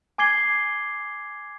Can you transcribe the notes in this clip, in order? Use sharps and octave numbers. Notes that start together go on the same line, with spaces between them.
G#5 D6 G#6 C7 G7